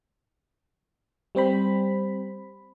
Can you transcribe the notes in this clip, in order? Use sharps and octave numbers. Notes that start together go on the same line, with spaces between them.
G3 C4 C5 B5